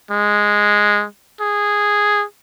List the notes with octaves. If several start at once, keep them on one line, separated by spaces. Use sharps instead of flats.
G#3
G#4